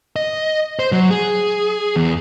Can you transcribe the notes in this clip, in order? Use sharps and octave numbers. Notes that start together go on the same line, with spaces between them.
D#5
C5
F#3
G#4
E2